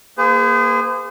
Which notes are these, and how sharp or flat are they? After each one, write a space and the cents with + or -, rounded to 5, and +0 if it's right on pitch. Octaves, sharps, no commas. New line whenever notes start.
A#3 +5 G#4 -20 C5 -45